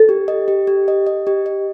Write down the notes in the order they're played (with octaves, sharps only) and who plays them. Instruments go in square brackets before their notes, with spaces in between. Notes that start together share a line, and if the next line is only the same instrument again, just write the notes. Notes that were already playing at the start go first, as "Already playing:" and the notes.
Already playing: [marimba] A4
[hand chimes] G4
D#5
G4
G4
D#5
D#5
G4
D#5